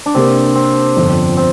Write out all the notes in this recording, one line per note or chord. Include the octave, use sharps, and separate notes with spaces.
D4
C3 A#3 C4 G4 A#4
C4
G1 F2 F3
C4